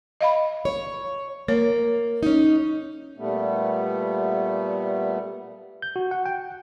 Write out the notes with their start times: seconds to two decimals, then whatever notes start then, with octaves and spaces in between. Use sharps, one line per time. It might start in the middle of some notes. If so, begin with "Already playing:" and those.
0.21 D#5 F5 B5
0.65 C#5
1.48 A#3 C#5
2.23 C#4 D#4
3.17 A#2 G3 A3 B3
5.82 G6
5.96 F#4
6.11 F#5
6.26 G5